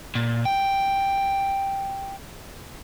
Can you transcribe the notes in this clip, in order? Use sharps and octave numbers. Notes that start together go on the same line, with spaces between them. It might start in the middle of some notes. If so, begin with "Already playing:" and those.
A#2
G5